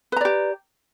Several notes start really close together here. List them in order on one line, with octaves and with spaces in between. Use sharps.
B4 A#5 D5 G4